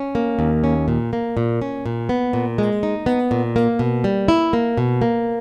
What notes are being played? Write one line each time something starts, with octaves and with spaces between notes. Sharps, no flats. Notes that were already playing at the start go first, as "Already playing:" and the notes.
Already playing: C#4
A#3
D#2
C#4
A#2
A#3
A#2
C#4
A#2
B3
A#2
G#3
D#4
B3
A#2
A#3
B2
G3
E4
A#3
B2
A#3